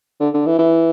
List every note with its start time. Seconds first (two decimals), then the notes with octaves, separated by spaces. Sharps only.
0.20 D3
0.34 D3
0.46 E3
0.59 E3